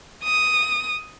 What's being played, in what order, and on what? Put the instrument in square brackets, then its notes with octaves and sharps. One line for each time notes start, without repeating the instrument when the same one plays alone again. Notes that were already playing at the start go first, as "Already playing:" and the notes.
[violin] D#6